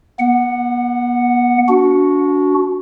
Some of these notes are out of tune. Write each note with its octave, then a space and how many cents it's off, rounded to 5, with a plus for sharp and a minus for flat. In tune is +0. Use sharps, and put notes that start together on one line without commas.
B3 -40 F#5 +0
D4 -30 F#4 +0